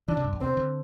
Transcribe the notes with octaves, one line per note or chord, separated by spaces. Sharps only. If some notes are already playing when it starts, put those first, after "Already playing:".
E3 D4
C3
G2
E2
C3 C4
D3